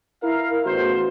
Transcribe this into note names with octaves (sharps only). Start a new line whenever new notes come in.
E4 A#4 F5
A1 E2 F#4 C5